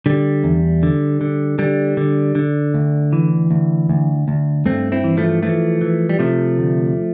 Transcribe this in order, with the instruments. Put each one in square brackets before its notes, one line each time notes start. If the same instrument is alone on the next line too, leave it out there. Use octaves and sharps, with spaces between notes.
[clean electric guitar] D3 G3
E2
D3
D3
D3 G3
D3
D3
D2
E3
D2
D2
D2
G2 A3 C4
C4 E4
E3
F3 A3
E3 F3 A3
E3
G3
C3 F3 A3
D2